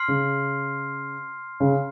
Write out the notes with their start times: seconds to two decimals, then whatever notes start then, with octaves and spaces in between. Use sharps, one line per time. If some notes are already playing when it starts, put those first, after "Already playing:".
Already playing: C6 F6 C7
0.08 C#3
1.60 C#3